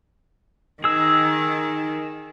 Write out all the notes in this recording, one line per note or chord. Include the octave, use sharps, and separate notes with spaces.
D#3 G#4 E6